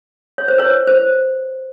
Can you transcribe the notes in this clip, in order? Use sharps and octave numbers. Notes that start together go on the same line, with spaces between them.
C#5
C5
B4 C#5
C5